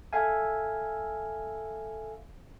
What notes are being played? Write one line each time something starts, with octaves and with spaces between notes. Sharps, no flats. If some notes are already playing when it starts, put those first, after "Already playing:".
A4 E5 F5 G#5